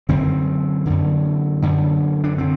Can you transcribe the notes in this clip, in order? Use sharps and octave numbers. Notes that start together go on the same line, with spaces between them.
F#2 D3 C4
F#2 D3
F#2 D3
D4
D3 C4